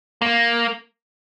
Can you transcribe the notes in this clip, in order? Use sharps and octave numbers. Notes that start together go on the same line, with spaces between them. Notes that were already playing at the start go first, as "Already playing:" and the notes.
A#3